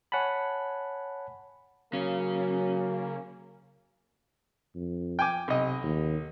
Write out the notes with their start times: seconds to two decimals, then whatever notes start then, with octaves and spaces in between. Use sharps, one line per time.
0.12 C#5 F#5 G#5 A5 B5
1.93 C#3 F#3 A#3 C#4
4.75 F2
5.19 G5 G#5 D6
5.48 B1 C3 D#5
5.83 D#2